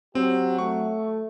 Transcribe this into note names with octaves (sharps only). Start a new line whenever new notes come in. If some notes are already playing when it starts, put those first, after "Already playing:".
F#3 C4 G4
A3 C#6